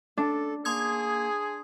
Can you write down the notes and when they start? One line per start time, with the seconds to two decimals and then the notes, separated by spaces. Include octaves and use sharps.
0.17 D4 A4
0.65 A#3 G#4 C6 D#6 G#6